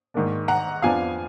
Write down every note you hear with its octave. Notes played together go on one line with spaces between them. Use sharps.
G#2 D#3 A#3 D4
F#5 A#5
F2 F3 B3 D4 F5 G#5